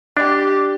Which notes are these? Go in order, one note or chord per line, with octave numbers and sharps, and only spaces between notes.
D4 G4